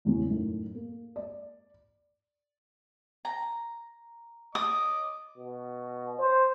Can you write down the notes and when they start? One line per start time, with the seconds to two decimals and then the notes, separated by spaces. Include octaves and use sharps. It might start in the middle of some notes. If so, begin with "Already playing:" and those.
0.05 A1 E2 C#3 F#3
0.29 F#2 A2 D#4
0.75 A#3
1.16 D5
3.25 A#5
4.55 D#5 D6 D#6
5.37 B2
6.19 C5